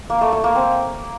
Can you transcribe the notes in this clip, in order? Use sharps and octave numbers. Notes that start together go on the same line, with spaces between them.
A#3
A3
A3
A#3
C4